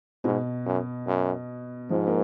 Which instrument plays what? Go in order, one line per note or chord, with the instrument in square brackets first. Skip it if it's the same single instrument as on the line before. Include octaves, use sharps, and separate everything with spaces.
[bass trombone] G#2 [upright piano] B2
[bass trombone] F#2
F#2
[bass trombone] G#2 [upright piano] F3
[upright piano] A#3